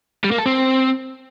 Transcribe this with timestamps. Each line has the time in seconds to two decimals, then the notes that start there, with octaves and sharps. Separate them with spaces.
0.25 G3
0.32 A#3
0.39 A4
0.46 C4